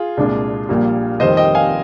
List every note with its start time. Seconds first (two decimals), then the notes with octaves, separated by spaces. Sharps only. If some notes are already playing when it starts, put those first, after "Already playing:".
Already playing: F4 G#4
0.17 C2 A#2 G#3 D4
0.69 A#1 A#2 G3 A#3
1.20 F1 F2 D#3 G3 C5 D#5
1.37 D#5 G5
1.55 F5 G#5